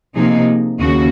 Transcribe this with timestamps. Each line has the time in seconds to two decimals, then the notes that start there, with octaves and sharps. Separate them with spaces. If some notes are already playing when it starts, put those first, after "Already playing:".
0.16 C3 F3 A#3 D#4 G#4
0.81 D#2 C#3 F#4